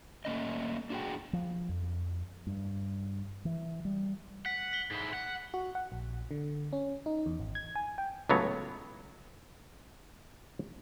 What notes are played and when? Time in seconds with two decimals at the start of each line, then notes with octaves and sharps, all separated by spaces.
0.25 A3 A#3 C#4 D#5
0.90 D4 F#4 G#4 G5
1.33 F3
1.69 F2
2.47 G2
3.45 E3
3.85 G3
4.46 F#5 B6
4.73 B6 G7
4.91 G#2 E4
5.13 F#5
5.54 F#4
5.75 F#5
5.92 A#1
6.31 D3
6.73 C#4
7.06 D#4
7.26 E2
7.40 G#1
7.55 G#6
7.76 G#5
7.98 G5
8.29 C#2 A2 F#3 B3 C#5